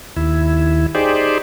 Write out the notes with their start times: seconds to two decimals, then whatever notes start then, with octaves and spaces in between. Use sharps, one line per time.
0.17 D#2 E4
0.95 D#4 G4 G#4 C5 D5